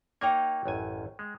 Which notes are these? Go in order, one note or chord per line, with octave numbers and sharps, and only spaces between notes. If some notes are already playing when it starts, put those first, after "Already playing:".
A#3 D#4 C#5 G5 A#5
A1 F#2 G#5
G#3